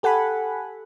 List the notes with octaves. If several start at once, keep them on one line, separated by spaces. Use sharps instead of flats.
G4 A4 F#5 G#5 B5